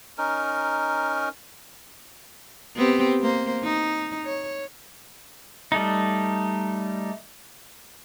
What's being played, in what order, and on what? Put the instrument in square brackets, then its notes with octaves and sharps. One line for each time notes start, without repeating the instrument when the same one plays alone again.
[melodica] C#4 D#4 A#4
[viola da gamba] B3 C4 G4
A#3 C5
D#4
C#5
[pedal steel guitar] G3 A3 D#4